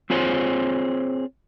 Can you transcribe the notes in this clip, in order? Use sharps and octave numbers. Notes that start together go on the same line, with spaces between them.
C4 F4 G#4 C5 C#5